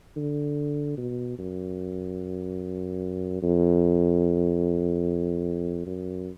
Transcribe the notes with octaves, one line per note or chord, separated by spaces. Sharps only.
D3
B2
F#2
F2
F#2